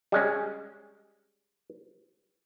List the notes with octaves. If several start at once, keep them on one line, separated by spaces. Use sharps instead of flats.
G3 G#3 C#4